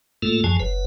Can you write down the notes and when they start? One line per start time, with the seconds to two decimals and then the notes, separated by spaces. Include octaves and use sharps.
0.22 A2 A3 A#3 F4 A4
0.44 F#2 F3 G#4 G#5 A5
0.60 F#1 B4